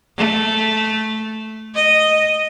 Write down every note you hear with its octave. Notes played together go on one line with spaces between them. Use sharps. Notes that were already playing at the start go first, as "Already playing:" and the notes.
A3
D#5